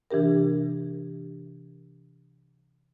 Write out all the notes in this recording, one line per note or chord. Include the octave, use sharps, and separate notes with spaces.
C3 E3 D4 G4 A#4